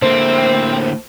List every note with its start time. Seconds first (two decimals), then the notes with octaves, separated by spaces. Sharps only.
0.02 A2 D3 A3 A#3 C4 C5